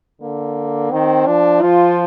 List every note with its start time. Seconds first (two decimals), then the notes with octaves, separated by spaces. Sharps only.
0.21 D3 A#3
0.92 D#3 C4
1.27 F3 D4
1.62 F3 F4